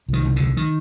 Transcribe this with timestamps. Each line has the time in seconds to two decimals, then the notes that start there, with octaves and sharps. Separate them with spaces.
0.09 C2 D#3
0.25 C2
0.36 C2 D3
0.57 D#3